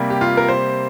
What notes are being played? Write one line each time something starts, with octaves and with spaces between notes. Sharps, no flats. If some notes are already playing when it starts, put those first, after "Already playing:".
Already playing: C3 G3 A#3
G4
F4
A#4
C5